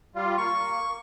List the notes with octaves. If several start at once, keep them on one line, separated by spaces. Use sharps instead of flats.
G3 F4
A#3 C#6